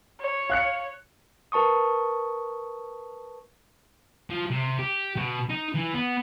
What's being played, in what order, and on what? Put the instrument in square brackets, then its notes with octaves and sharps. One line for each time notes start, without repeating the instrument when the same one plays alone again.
[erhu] C#5
[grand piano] F5 F#6 C#7
[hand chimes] A#4 B4 A5 C#6 D#6
[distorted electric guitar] F3
C3
G4
B2
D#4
E3
B3